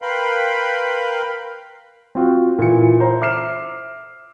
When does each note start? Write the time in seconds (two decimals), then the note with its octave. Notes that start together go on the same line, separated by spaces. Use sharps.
0.02 A#4 B4 F5 G5 B5 C6
2.15 C4 F4 F#4
2.59 A#2 E3 C#7
3.00 C5 E5 A#5
3.21 E5 D6 F6 C7 E7